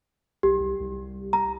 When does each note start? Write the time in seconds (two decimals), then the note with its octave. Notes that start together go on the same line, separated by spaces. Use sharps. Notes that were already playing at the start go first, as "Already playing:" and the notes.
0.43 B1 G4
0.60 C2
0.80 C2
1.33 A#5